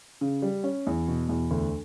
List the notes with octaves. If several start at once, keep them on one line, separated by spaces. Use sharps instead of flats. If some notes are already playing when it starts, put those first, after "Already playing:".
C#3
G3
C#4
E2
B2
E2
D2